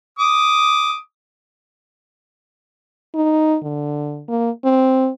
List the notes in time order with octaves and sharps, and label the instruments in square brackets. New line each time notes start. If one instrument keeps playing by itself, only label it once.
[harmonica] D6 D#6
[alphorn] D#4
D3
A#3
C4